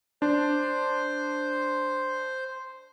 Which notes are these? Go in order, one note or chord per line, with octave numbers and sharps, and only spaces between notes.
D4 C5